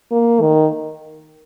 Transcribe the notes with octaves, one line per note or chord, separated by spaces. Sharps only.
A#3
D#3